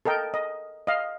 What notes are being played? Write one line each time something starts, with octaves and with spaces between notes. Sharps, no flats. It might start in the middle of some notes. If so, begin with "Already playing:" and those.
A4 A#4 D#5 G5
D#5
D#5 F5